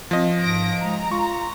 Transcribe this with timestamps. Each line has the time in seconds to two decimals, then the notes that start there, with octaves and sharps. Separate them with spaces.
0.11 F3 C4 D#5
0.40 G#2 A#6 D7
0.82 G#3 A#5
1.11 F4 C#6